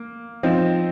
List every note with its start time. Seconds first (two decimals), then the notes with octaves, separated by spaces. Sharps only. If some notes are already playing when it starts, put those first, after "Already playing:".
Already playing: A#3
0.43 F3 C4 D#4